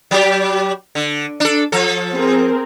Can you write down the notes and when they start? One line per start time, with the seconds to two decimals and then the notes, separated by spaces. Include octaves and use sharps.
0.11 F#3 G4
0.95 D3
1.40 D4 A4
1.72 F3 A4
2.14 C4 G#4 A#4